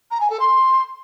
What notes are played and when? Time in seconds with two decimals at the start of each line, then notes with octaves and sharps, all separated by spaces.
0.11 A#5
0.20 G#5
0.30 A4
0.39 C6